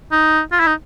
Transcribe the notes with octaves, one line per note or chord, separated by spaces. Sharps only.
D#4
F4
E4
D#4